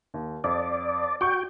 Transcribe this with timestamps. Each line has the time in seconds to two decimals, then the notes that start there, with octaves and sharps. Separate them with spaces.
0.14 D#2
0.44 F2 D5
1.21 F#4 F#5 G5 C#6